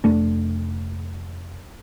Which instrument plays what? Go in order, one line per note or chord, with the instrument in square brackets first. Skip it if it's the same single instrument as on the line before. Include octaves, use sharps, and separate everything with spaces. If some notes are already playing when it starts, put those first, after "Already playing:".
[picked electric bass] F1 A3 D4